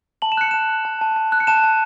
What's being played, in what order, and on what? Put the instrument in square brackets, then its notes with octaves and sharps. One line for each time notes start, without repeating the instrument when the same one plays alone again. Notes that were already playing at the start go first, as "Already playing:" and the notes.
[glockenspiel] A5 F#7
E7
F#6 C#7
A5 E7
F#6
A5
A5
A5
F#6
C#7
A5 E7
A5